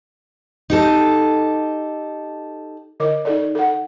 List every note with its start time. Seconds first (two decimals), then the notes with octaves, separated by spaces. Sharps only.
0.70 D#4 G4 A4
3.00 D3 A#4 D#5 D6
3.25 D#4 A4 D5
3.55 A4 F#5